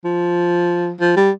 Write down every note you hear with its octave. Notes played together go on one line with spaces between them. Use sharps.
F3
F3
G3